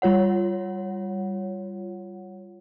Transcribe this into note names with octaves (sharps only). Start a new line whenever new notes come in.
G3 F4 C#5 F#5